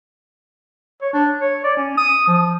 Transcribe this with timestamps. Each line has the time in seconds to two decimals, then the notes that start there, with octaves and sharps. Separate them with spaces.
1.02 C#5
1.13 D4
1.41 C#5
1.64 D5
1.77 C#4
1.97 D#6
2.27 F3